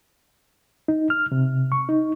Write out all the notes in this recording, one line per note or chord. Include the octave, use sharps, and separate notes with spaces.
D#4
F6
C3
C#6
D#4